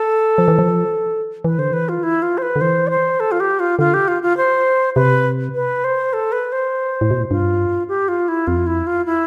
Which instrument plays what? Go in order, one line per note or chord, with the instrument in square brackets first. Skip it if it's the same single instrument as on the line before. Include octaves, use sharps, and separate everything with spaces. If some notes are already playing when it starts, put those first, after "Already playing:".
Already playing: [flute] A4
[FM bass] F3
E3
F3
[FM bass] E3 [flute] B4
[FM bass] D3 [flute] C5
[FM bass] E3 [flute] B4
[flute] F4
E4
F4
C5
B4
[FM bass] D3
[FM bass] E3 [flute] C5
[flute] D5
C5
A4
F4
G4
F4
[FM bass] D3 [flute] F4
[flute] G4
F4
F4
C5
[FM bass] C3 [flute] B4
[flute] B4
C5
A4
B4
C5
[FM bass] A2
B2
A2
[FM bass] G2 [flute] F4
[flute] G4
F4
E4
[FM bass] F2 [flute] F4
[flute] E4
F4
E4